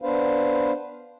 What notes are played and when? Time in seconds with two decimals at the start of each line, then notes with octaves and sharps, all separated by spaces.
0.02 B3 D4 B4 C5 F5